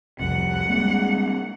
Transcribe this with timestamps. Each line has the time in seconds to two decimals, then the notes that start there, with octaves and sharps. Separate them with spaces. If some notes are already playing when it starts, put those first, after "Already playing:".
0.20 C2 F2 C3 F#5
0.69 G3 G#3 A#3 C4